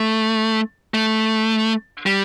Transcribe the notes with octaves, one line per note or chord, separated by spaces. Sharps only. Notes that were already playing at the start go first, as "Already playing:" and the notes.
Already playing: A3
A3
G3